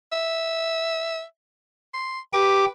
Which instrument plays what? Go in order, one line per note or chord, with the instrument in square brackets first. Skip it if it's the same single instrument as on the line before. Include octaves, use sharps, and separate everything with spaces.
[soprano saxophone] E5
C6
[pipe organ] G4 D6 [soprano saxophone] B4